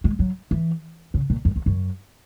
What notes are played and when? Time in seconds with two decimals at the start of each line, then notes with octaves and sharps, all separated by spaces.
0.04 G#3
0.19 F#3
0.51 E3
1.14 C#3
1.30 A#2
1.45 F#2
1.56 E2
1.66 F#2